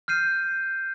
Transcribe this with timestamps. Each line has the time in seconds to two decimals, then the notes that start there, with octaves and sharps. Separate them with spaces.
0.08 F6 G6 C7 D#7